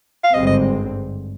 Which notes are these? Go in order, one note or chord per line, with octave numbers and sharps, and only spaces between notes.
F5
G#1 G2 D3 G#3 C4 D#5
D#5